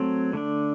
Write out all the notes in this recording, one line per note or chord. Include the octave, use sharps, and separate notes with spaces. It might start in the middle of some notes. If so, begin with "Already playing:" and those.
Already playing: F#3 A3 C4
D3 A3 D4